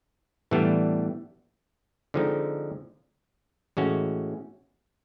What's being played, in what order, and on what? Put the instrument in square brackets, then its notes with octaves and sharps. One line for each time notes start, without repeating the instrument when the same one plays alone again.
[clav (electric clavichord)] A2 E3 G3 B3 D4
D3 F3 G#3 C4 D#4
A2 E3 G#3 C#4 F#4